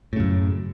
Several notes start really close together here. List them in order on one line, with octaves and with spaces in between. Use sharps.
A2 C#3 F#2